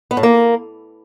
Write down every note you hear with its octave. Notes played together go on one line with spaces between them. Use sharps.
B3
A2
A#3